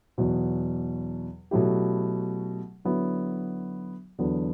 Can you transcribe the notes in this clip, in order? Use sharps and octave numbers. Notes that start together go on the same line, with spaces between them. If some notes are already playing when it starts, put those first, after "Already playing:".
E2 B2 F#3
B2 F#3 A3 E4 G4
D3 F#3 B3 E4
E2 D3 F#3 B3